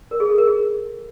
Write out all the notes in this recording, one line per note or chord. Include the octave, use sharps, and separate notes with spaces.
A#4
G#4
A4
A#4
G#4